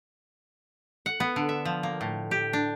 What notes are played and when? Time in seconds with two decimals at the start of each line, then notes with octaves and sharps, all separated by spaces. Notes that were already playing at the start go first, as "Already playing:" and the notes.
1.06 F#5
1.20 B3
1.36 D3
1.49 E5
1.65 F3
1.83 A#3
2.01 A2
2.31 G4
2.53 D4